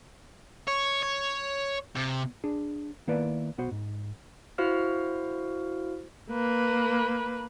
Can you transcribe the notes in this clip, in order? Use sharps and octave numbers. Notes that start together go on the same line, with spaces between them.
C#5
C#5
C3
D4 G#4
D#3 A#3 B3 E4 B4 D5
B1 B3 F#4 C5
G#2
E4 F#4 C5 F5 F6
A#3 B4